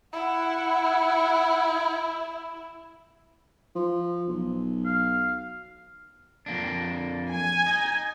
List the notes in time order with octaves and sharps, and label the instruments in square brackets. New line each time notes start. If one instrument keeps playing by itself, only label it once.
[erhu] E4 [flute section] F#5
[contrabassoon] F3
B1
[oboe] F5
[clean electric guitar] F2 A#3 D4
[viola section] G#5
[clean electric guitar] D#4